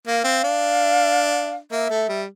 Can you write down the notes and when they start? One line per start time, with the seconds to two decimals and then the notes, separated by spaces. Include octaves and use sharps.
0.06 A#3 F5
0.24 C4
0.44 D4
1.71 A#3 E5
1.90 A3
2.09 G3